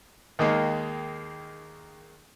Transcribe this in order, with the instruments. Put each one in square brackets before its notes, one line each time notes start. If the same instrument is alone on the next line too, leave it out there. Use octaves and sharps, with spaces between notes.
[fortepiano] D#2 D#3 G#3 A#3